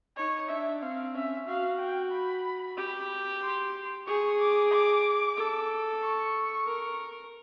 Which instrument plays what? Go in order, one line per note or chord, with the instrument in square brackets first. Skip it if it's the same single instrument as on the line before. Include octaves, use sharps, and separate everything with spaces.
[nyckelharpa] D#4 [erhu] C#5
[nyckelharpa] D4 [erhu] E5
[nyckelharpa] C4 [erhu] F5
[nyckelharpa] C#4 [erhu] E5
[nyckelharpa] F#4 [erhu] F5
[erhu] G5
B5
[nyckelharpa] G4
[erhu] C6
[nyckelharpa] G#4 [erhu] C#6
[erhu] D6
D6
[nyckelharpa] A4
[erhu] C#6
[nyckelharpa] A#4